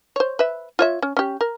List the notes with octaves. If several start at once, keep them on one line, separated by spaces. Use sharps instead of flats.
C5 C#5
B4 E5
F4 C#5 E5
C#4
C#4 G4
A#4